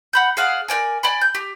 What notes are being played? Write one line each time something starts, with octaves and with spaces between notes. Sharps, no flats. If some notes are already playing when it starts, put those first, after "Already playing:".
F#5 B5 G6
G#4 D5 F5 F#5
A#4 C#5 D5 G#5
D5 G5 G#5 B5
G6
G4